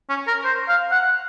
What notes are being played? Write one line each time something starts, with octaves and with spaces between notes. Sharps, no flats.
C#4
A#4
C5
F5
F#5